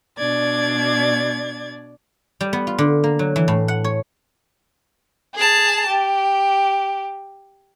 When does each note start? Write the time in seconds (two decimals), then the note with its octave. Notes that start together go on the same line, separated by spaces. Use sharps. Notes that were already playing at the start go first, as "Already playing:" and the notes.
0.18 B2 D4 D5 G#6 A6
2.41 G3
2.53 B3
2.67 F4
2.78 D3
3.04 A#3
3.19 F#3
3.36 E3
3.48 A2
3.68 F#5
3.84 C#5
5.35 G#4 A5
5.87 G4